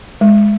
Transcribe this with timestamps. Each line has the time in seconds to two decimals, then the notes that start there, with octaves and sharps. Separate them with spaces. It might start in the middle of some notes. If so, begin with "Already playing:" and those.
0.21 G#3